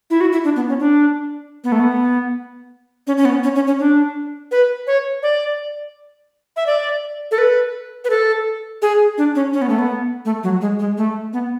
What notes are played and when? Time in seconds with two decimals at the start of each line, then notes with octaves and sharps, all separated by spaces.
0.10 E4
0.21 F#4
0.33 E4
0.44 D4
0.56 B3
0.69 C#4
0.80 D4
1.64 B3
1.72 A3
1.80 B3
3.07 C#4
3.17 C#4
3.25 B3
3.44 C#4
3.55 C#4
3.67 C#4
3.80 D4
4.51 B4
4.87 C#5
5.23 D5
6.57 E5
6.67 D5
7.31 A4
7.38 B4
8.05 B4
8.10 A4
8.82 G#4
9.18 D4
9.35 C#4
9.54 C#4
9.62 B3
9.69 A3
9.79 B3
10.25 A3
10.43 F#3
10.61 G#3
10.79 G#3
10.97 A3
11.33 B3